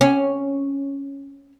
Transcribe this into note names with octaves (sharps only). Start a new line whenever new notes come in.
C#4